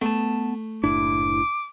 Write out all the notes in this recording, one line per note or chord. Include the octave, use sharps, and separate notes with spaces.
A3 B3 A5
F#1 A2 D4 E4 D6